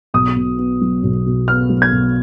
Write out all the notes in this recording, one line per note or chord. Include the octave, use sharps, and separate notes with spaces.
B1 D#6
B2
B3
F#3
B1
B2
B3 F6
F#3
G#6
B1